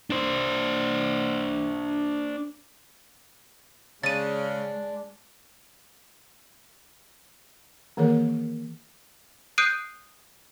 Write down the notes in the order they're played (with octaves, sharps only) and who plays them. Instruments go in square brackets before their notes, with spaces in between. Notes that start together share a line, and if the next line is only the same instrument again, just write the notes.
[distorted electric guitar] D4 C5
[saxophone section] C#3 [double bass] G#3 [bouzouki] D4 [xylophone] A6 D#7
[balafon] D#3 E3 A#3 G#4 A#4 C#5
[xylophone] D#6 F#6 G6 C7 D7 D#7